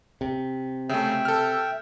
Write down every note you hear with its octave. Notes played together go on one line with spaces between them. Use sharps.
C3
C#3 A3 E5 G5
A4 F6